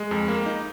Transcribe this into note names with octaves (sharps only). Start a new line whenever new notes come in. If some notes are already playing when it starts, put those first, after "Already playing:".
Already playing: G#3
F2
A#3
D#4